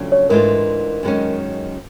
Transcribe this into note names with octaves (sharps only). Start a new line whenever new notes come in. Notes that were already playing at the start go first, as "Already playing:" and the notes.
Already playing: F2 C#3 F#3 A3 D4
C#5
G#2 E3 A3 D4 F4 A#4
F#2 D#3 G#3 C#4